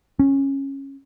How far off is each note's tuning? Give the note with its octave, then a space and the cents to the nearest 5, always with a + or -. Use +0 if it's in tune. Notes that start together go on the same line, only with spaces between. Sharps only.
C#4 -15